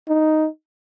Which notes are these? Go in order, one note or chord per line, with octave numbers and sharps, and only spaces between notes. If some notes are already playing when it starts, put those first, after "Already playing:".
D#4